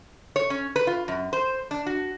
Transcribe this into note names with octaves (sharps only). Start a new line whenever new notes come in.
C#5
C#4
B4
F4
F#2
C5
D4
F#4